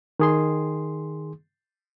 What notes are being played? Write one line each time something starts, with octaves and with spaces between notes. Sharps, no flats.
D#3 G#4 C6